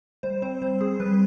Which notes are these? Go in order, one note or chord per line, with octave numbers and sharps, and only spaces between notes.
G3 C5
C4 C5
G3 C5
C4 G#4
G3 B4